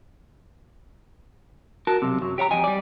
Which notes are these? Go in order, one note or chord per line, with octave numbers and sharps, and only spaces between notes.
F#4 A#4 A5
B1 C3
F#2 F#3
G4 C#5 F5 A#5
F2 G4 D#5 G#5
G3 D5